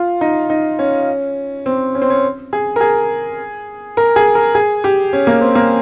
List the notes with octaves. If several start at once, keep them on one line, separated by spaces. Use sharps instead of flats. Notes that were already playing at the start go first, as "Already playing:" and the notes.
Already playing: F4
D#4
D#4
C#4
C4
C#4
C4
C#4
G#4
A#4
G#4
A#4
G#4
A#4
G#4
G4
C#4
A#3
C4
A#3